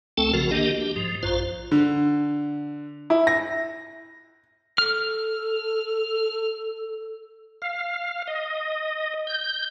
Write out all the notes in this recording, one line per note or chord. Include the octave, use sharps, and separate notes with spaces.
C#2 A3 C4 A4 G5 A5
B1 C#3 F3 F#4 A#4
D#3 A#3 D4 G4 D#5
G4
G#2 F3
A#1 F#2 F4 C5
D3
E4
A#6
A4 F6
F5
D#5
G6